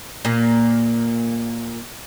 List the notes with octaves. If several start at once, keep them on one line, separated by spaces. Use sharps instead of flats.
A#2 A#3